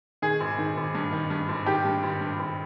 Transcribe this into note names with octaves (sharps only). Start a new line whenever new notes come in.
D#3 G#4
G#1
D#3
G#1
G2
D#3
G2
G#1
D#3 G4
G2
G#1
G2
G#1